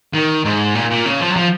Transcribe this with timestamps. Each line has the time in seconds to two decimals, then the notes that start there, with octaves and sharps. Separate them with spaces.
0.14 D#3
0.45 G#2
0.75 A#2
0.90 A#2
1.05 C#3
1.20 F3
1.30 F#3
1.36 F3